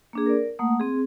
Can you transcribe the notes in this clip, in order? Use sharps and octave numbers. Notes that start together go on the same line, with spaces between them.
A#3 D4 G#4
A#4 D5
A3 A#3 F#5 D#6
C4 G#4